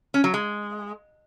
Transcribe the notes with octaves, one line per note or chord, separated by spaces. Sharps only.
C#4
F#3
G#3